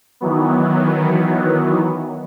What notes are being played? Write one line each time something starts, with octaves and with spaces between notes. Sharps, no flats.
D#3 E3 F#3 B3